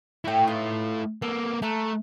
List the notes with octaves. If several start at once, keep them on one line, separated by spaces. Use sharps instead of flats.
A3 E4 F#4 G5
D#4 F4 B4
A#3 B3 A4
A3 A5 A#5 F#6